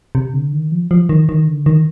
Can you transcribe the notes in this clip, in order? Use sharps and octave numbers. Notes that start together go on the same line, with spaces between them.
C3
D3
D#3
F3
F3
D#3
D#3
D3
D#3